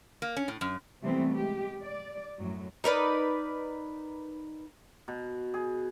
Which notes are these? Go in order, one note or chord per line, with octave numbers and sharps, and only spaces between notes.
A#3
C#4
A2
F#2
C3 E3 G3 A3 B3 C4
G#3 G4
D5
F#2 A2 F#3
D#4 A#4 B4 D5
B2
G#4